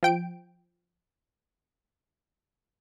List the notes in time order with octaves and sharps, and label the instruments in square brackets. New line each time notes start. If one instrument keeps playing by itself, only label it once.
[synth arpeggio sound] F3 G5 D7